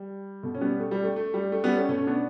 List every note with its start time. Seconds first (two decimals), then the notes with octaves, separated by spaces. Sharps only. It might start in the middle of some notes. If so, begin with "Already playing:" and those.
Already playing: G3
0.43 B2 A3
0.55 C#4
0.61 G3 B3
0.79 A3
0.91 G3
1.04 A3
1.16 A3
1.34 G3
1.52 A3
1.64 G3 B3
1.76 A3 C#4
1.89 B2 A3 C#4
2.07 B3 D4